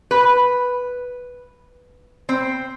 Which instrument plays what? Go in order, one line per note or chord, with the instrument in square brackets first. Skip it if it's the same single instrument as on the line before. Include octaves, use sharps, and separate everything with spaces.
[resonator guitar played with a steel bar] B4
C4